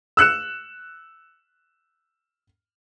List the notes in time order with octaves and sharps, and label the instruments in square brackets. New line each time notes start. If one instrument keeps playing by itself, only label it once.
[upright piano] E6 F#6 C#7 E7